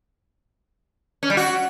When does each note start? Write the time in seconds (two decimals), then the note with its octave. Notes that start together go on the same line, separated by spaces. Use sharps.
1.23 C#4
1.30 G3
1.37 F#4